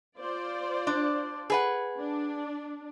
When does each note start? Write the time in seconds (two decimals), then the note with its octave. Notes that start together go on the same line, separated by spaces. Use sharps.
0.18 F4 C5 D5
0.87 D4
1.50 G#4 B4 F#5
1.99 D4